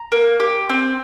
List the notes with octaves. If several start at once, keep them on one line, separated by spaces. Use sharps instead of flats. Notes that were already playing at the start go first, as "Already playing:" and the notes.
Already playing: A#5
A#3
G4
C4